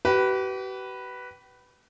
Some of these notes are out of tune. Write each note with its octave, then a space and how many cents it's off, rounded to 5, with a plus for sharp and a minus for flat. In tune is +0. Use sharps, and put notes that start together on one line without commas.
G4 -45 B4 +0 B5 +0